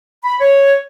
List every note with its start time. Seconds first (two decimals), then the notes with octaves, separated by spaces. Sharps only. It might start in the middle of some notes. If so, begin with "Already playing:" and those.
0.24 B5
0.40 C#5